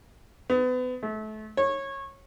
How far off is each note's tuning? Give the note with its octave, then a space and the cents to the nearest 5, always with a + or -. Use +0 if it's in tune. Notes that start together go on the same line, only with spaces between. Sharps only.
B3 +35
A3 -30
C#5 -20